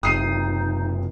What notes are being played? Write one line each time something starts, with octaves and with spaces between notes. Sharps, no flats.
F#1 C3 D#4 D#6 C7 D#7